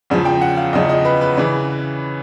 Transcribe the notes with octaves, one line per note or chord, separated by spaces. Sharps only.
E2 C#3 F3
G5
F#5
F5
E2 C#3 F3 D#5
D#5
B4
B4
C#3 E3